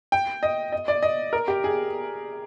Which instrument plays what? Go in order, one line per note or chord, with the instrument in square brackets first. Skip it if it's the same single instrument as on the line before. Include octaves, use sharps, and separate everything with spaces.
[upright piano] G5
D#5
D#5
D5
D#5
A#4
G4
G#4